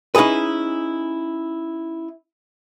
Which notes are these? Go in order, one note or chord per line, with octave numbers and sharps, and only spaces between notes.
C#4 D#4 E4 G#4 B4